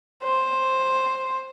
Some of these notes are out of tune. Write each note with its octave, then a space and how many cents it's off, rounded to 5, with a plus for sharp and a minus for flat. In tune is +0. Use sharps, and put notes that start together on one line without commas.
C5 +5